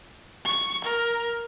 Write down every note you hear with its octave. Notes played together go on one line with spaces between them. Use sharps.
C#6
A#4